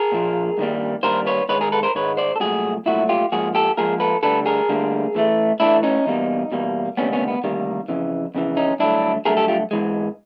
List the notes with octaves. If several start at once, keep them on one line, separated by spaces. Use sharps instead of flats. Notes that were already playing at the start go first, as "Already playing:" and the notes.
Already playing: G#4 A#4
A#2 F3 A#3
G2 D#3 G3 A#3
G2 D#3 G3 A#3 A#4 C5
B4 C#5
G#2 D#3 G#3 B4 C#5
G#4 A#4
A4 B4
A#4 C5
G#2 D#3 G#3 B4 C#5
C5 D5
A4
C2 A#2 F#3 A3 F#4 G#4
C2 A#2 F#3 A3 E4 F#4
F4 G4
G#2 F3 A#3 F#4 G#4
G4 A4
G#2 F3 A#3 G#4 A#4
A4 B4
D2 D3 G3 A4 B4
G#4 A#4
D2 D3 G3 A#3
A2 E3 A3
A2 E3 A3 D4 E4
C#4 D#4
E2 B2 G3 A#3
E2 B2 G3 A#3
D2 C3 D#3 G3 A#3 B3 C#4
B3 C#4
B3
D2 C3 D#3 G3 A#3
F2 C#3 E3
F2 C#3 E3
C#4 D#4
G2 D3 F#3 A3 D4 E4
G2 D3 F#3 A3 G#4 A#4
G4 A4
F4 G4
G#2 E3 G#3